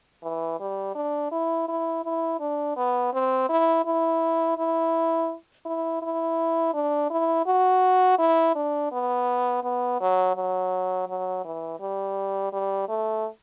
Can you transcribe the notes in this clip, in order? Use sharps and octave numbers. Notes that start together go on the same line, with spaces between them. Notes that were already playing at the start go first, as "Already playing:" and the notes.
E3
G3
D4
E4
E4
E4
D4
B3
C4
E4
E4
E4
E4
E4
D4
E4
F#4
E4
D4
B3
B3
F#3
F#3
F#3
E3
G3
G3
A3